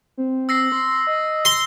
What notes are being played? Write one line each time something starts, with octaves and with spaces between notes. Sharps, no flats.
C4
E6 A#6 C7
C6
D#5
C6 A#6